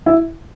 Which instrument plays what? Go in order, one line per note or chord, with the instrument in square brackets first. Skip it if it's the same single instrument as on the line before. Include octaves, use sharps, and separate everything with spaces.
[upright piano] E4